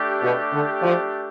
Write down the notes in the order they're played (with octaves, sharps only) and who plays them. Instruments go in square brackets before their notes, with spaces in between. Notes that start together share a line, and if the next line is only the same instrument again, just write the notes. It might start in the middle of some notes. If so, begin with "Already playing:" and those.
Already playing: [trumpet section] A3 D4 G4
[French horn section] B2
D3
F3